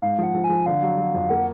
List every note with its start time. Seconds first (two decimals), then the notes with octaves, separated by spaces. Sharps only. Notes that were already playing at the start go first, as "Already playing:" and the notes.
0.02 G#2 F5
0.19 F3 F#5
0.34 F3
0.44 G#5
0.49 F3
0.66 D3 F5
0.82 F#3
0.98 F#3
1.14 F2
1.29 A#3 F#5